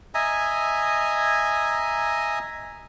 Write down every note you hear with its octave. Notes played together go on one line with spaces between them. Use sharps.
D#5 E5 G#5 A#5